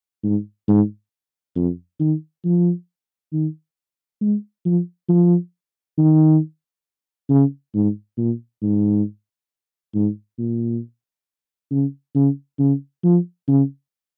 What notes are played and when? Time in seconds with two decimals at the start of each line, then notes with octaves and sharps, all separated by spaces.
0.23 G#2
0.68 G#2
1.55 F2
2.00 D#3
2.45 F3
3.33 D#3
4.21 G#3
4.65 F3
5.09 F3
5.98 D#3
7.29 C#3
7.74 G#2
8.18 A#2
8.62 G#2
9.94 G#2
10.38 A#2
11.71 C#3
12.15 C#3
12.59 C#3
13.04 F3
13.48 C#3